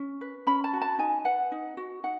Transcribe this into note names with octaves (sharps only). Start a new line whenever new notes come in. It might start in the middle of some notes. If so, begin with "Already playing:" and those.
Already playing: C#4
B4
C#4 B5
A5
F#4
A5
D#4 G#5
B4 F#5
D#4
F#4
D#4 F#5